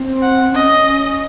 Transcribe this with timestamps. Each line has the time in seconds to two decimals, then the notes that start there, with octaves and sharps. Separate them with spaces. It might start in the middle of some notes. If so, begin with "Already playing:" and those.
Already playing: C4
0.22 F#5
0.54 C#4 D#5